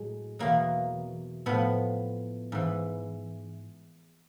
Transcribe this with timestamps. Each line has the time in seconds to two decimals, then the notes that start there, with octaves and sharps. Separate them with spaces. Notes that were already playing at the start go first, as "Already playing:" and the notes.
Already playing: A2 F#3 G#3
0.39 E2 B2 F#3 A#3
1.46 A2 F3 B3
2.52 G#2 E3